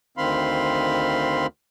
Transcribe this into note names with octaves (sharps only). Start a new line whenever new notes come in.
D2 D#3 C4 F5 B5 C6